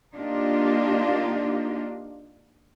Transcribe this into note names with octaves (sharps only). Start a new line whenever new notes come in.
A#3 D4 D#4 F4 G4